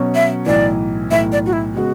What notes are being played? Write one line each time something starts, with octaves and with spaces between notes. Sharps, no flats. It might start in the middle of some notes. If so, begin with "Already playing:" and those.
Already playing: B2 F#3 C#4 F#4
E5
B1 A2 E3 D5
B1 A2 E3 E5
D5
F#4
E4
C#3 G#3 B3 F#4